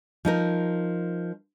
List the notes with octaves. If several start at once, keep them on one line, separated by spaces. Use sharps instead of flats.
F3 D#4 A#4